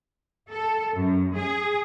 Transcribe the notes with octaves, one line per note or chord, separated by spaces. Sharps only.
A4
F#2
G#4